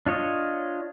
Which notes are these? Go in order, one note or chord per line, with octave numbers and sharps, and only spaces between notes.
D4 F4 C#5 D#5